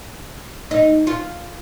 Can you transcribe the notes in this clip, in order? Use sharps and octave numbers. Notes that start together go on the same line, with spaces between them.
D#4
F4